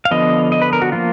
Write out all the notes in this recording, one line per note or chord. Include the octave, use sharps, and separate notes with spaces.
F5
D3 F3 B3 D#5
D#5
B4
A#4
F#4
F3 A#3 F4